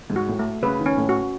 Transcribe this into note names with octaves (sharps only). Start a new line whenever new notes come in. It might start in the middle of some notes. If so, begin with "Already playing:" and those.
G#2
F#4
A2
A3
C#3 B4
D#3
C#4
A2
F#4